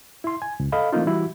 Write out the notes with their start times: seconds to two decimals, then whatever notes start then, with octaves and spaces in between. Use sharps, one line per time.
0.24 E4 C6
0.42 G#5
0.60 C#2
0.72 A4 D#5 F5 B5
0.93 E3 A3 A#3 C4 D#4 F4
1.06 E3 G3 E4 F#4